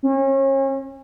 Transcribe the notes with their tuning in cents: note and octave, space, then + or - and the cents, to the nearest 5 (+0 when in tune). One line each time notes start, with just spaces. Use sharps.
C#4 -35